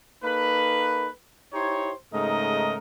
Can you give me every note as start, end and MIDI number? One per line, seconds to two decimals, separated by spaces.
0.24 1.09 58
0.24 1.09 63
0.24 1.09 69
0.24 1.09 71
1.54 1.92 63
1.54 1.92 64
1.54 1.92 67
1.54 1.92 72
1.54 1.92 73
2.13 2.78 44
2.13 2.78 49
2.13 2.78 57
2.13 2.78 63
2.13 2.78 70
2.13 2.78 75